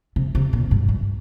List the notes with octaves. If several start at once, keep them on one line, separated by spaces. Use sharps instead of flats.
C3
C3
A#2
G2
G2